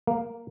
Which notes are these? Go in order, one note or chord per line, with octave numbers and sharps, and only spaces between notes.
A#3